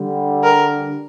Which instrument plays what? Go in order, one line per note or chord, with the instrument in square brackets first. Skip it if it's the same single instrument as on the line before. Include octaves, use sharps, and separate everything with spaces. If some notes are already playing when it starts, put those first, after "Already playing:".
Already playing: [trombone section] D3 G3
[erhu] A#4